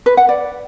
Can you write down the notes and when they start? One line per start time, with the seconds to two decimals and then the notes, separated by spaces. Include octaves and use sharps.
0.06 B4
0.17 F#5
0.29 D5